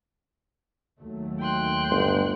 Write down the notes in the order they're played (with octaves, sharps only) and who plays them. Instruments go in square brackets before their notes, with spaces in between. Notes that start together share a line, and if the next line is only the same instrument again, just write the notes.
[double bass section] D#2 F#3 A3
[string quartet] G5 C6 F#6
[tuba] G1